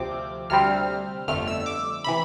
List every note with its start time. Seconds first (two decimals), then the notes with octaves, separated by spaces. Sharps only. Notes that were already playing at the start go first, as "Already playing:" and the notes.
Already playing: D2 C3 F3 C4 D6
0.50 D2 C3 G3 C4 F6
1.28 G1 F2 D3 A3 F6
1.48 E6
1.66 D6
2.04 C3 E3 B5